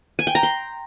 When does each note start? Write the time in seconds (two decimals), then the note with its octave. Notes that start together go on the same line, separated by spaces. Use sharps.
0.19 G#5
0.27 G5
0.35 A#5
0.43 C6